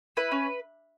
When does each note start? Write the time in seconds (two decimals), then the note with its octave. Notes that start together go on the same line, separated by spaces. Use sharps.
0.17 E4 B4
0.32 C#4